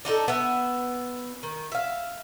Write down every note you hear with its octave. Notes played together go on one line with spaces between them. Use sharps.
D4 D#4 F4 A4
B3 E5
D#3
E5 F5